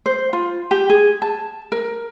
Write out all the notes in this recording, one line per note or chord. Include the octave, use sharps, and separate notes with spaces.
C5
F4
G4
G#4
A5
A#4